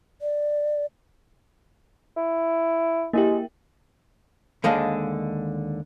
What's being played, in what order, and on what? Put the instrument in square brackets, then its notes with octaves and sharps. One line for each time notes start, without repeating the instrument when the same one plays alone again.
[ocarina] D5
[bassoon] E4
[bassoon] G#3 [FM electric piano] A#3 E4 G4
[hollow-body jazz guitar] D#2 D3 G#3 D4 D#5 F5